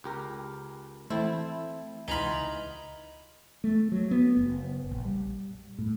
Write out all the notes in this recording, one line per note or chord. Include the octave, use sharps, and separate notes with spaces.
C#2 G4 A#4
E3 A3 C4 E4 A4 C5
C#2 E3 D#4 F4 G#4 A#5 B5
A3
F#3
B3
F#1
A#1
G3
A2